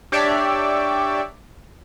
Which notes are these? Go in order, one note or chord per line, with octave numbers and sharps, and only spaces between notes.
D4 G4 C#5 D5 E5